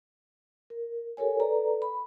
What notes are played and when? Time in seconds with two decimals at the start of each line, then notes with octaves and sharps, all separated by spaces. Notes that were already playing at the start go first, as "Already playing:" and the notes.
0.70 A#4
1.17 G4 A4 A#4 C#5 G#5
1.40 A4 B4 D5 A#5
1.82 B5